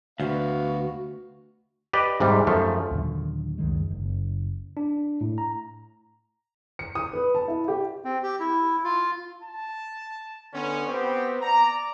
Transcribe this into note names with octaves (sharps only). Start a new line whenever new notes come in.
D2 B3 F#4 F5
G4 B4 D5 D#5
G#2 C3 G3
F#2 F3 A3
D#2 A#2 D3 F#3
C#2 F#2 D#3 G#3
F#1
D4
A2
A#5
C#7
D#6
B4
A5
E4
G4
C4
G4
E4
F4
A5
D3 B3 C#4
B3 C4 F#4 G4
D5 A#5